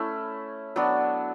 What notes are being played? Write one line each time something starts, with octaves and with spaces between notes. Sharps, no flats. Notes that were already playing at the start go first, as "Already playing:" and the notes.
Already playing: A3 C#4 E4
F#3 B3 D4 F#4